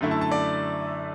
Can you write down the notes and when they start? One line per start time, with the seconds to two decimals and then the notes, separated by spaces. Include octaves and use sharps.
0.01 F#2 D3 A3 E4
0.11 A5
0.21 A5
0.31 D5